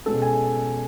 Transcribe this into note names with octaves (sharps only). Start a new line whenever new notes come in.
B2 G#3 C#4 A4
G#5